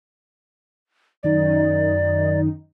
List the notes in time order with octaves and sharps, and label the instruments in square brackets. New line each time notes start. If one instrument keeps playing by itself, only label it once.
[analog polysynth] F#2 D#3 D#4 [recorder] D5